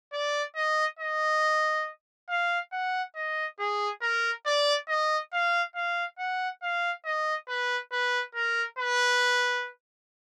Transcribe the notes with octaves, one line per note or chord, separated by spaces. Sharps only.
D5
D#5
D#5
F5
F#5
D#5
G#4
A#4
D5
D#5
F5
F5
F#5
F5
D#5
B4
B4
A#4
B4